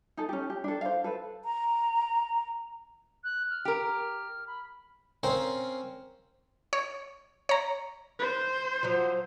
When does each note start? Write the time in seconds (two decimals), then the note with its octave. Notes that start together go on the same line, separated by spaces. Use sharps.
0.17 D#4 A4
0.29 C#4 G4
0.50 G4
0.64 D4 A4
0.81 C5 F5
1.04 A4 B4
1.45 A#5
3.24 F#6
3.50 F6
3.65 G4 A#4
4.47 B5
5.23 C4 C#4 A#4 F5 G5
6.73 C#5
7.49 C#5 A#5
8.19 C5
8.83 F3 F#3